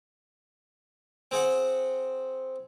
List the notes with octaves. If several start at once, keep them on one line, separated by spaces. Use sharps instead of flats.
C4 G#4 F#5